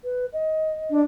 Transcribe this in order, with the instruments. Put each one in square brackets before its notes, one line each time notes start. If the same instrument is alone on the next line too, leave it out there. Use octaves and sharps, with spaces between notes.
[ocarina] B4
D#5
[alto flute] D4